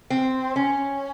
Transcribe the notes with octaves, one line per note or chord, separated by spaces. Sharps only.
C4
C#4